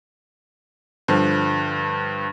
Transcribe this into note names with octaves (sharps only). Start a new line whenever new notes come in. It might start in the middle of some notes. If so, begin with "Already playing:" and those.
G2 D3 F3